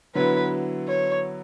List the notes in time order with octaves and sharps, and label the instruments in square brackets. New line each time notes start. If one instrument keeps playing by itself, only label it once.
[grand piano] D3 F#3 B3 E4 [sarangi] B4
[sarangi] C#5